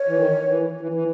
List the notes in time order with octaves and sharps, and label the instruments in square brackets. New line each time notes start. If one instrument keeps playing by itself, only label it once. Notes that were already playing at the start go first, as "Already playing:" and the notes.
Already playing: [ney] C#5
[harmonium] E3
D#3
E3
E3
E3